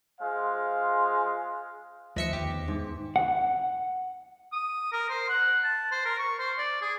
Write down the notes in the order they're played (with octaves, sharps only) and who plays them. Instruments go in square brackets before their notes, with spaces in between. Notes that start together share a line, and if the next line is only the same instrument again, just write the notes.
[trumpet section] G#3 F4 C5 F5
[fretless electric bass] D2 D#3 [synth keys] F3 E5 C#7 [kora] B4 D#5
[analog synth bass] E2 [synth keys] G4
[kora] G#2
[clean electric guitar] F#5
[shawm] D#6
A#4
C5
F#5
A5
C5
A#4
C#6
C5
D5
G#4